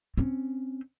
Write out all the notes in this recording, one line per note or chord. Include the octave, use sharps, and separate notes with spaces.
C4 C#4